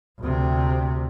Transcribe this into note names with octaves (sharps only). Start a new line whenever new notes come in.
D2 C3